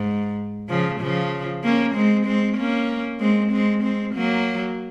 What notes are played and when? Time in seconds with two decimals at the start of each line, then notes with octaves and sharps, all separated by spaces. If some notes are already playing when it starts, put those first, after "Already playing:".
Already playing: G#2
0.69 C#3 F3
1.00 C#3 F3
1.63 A#3 C#4
1.94 G#3 C4
2.26 G#3 C4
2.57 A#3 C#4
3.20 G#3 C4
3.51 G#3 C4
3.83 G#3 C4
4.14 F#3 A#3